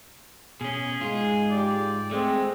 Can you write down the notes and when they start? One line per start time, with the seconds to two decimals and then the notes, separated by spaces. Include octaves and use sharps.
0.61 B2 C#4 G#4
1.01 G#2 G#3 F4
1.51 G4 D5
2.11 G#3 A3 C4 G#4